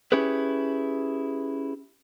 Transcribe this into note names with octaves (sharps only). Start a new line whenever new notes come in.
C#4 E4 G4 G#4 B4